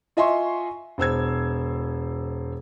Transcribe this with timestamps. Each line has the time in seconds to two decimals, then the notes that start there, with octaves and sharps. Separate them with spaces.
0.17 F4 D#5 E5 G#5 C6 C#6
0.98 E1 C5 E6 G#6